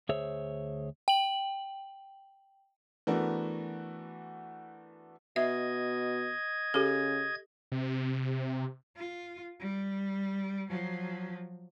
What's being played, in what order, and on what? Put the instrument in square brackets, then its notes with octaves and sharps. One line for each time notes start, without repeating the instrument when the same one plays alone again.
[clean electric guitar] D2 G#4 C5 C#5 E5
[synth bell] G5 F#7
[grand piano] E3 A3 B3 D4 F#4 A#4
[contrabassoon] B2 [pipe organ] D#5 G#6 [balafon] E5
[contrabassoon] C#3 [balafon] G4 A4
[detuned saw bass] C3
[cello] F4
G3
F3 F#3